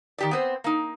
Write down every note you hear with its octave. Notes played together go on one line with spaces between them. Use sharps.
D#3 G4 D5
B3 C4 C5
A#3 D#4